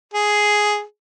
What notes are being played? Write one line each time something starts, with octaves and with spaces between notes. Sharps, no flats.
G#4